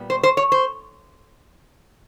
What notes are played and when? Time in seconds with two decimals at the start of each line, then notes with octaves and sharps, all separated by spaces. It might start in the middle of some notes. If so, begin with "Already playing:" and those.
Already playing: A#2 G3 B3
0.10 C5
0.23 C5
0.37 C#5
0.52 C5